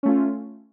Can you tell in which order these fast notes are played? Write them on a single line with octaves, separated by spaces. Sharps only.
C#4 A3 F4